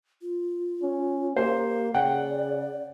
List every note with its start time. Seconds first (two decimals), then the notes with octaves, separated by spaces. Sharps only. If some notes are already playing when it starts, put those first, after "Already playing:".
0.22 F4
0.83 C#4
1.36 A#3 G4 C5
1.94 C#3 D5 F#5 G5